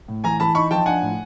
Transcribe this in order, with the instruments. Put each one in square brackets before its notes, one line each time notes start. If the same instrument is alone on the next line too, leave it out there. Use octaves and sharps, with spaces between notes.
[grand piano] A2
[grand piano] E3 [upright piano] G#5 A#5
[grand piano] E3 [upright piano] A5 B5
[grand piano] D#4 [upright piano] B5 C#6
[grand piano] F3 [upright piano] G5 A5
[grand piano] D4 [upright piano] F#5 G#5
[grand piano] A2